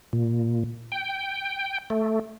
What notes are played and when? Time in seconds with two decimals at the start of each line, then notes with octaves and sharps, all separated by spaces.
0.13 A#2
0.92 G5
1.90 A3